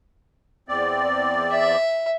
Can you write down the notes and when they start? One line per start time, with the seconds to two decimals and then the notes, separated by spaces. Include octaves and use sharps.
0.68 E2 C4 D5
1.51 E5